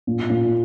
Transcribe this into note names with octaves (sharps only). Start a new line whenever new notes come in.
A#2
A#2